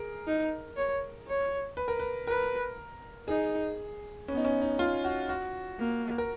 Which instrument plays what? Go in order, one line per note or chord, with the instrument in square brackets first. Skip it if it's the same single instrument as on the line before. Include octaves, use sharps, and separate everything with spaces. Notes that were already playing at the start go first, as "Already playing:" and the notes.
Already playing: [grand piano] G#4 A#4
[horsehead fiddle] D#4
C#5
C#5
[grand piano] B4
A#4
B4
[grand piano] A#4 [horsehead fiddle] B4
[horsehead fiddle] D#4 [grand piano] G#4
[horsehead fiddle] B3 [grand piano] C#4
[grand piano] D#4
C#4
D#4
F4
F#4
F#4
[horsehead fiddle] A#3
[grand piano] A#4